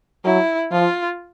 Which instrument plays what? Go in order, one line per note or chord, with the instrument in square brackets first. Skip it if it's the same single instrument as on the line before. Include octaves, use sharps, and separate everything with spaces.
[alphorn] F#3 [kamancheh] E4
[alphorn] F3 [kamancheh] F4